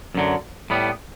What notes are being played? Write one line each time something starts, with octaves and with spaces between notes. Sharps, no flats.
F#2 D3 F#3
A2 G3 B3